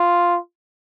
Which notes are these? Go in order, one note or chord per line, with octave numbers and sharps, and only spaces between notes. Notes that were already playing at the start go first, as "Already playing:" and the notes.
Already playing: F4